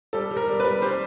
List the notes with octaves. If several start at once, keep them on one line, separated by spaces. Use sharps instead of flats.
G3 A4
G3
A#4
G3
G3 B4
G3 C5